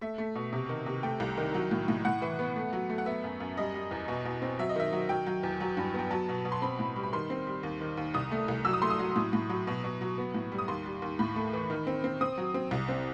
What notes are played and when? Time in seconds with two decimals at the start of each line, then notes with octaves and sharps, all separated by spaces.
0.01 A3 E5
0.18 A3
0.35 B2
0.53 C3
0.69 D#3
0.86 C3
1.03 A3 G5
1.20 C2
1.37 D#3
1.54 F#3
1.71 A2
1.88 A2
2.05 A2 F#5
2.22 E3
2.39 B3
2.56 A3
2.73 F#3
2.90 A3
2.98 F#5
3.06 B3 E5
3.24 F#2
3.40 F#2
3.57 G3 D#5
3.74 G3
3.91 E2
4.08 B2
4.25 B2
4.42 C4
4.59 F#3 E5
4.69 D#5
4.76 D#3 E5
4.93 F#3
5.09 F#3 G5
5.26 F#3
5.43 E2
5.60 F#3
5.77 G2
5.94 B3
5.99 G5
6.11 F#3 A5
6.29 B2
6.45 B2
6.52 C6
6.62 C4 B5
6.79 A2
6.96 G3
7.03 B5
7.13 D#3 C6
7.30 C4
7.47 G3
7.63 D#2
7.81 D#3
7.97 D#2
8.14 C2 D#6
8.31 A3
8.48 C2
8.65 F#3 E6
8.73 D#6
8.82 A3 C6
8.90 D#6
8.99 F#3
9.16 A2
9.33 A2
9.50 F#3
9.67 B2
9.84 B2
10.01 F#3
10.18 B3
10.34 A2
10.52 G3
10.58 D#6
10.68 D#2 C6
10.85 G3
11.02 D#2
11.19 A2 B5
11.36 A3
11.53 E3
11.70 D#3
11.87 C4
12.04 C4
12.21 C4 D#6
12.38 F#3
12.54 C4
12.71 C2
12.88 C4